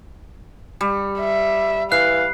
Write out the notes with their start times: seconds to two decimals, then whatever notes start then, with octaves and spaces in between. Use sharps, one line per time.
0.81 G3
1.20 E5
1.92 E3 F5 F#6 C7